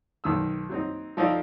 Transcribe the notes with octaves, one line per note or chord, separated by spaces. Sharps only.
B1 D#3 D#6 E6
F#3 C4 D#4
F3 D#4 A4 C5 D5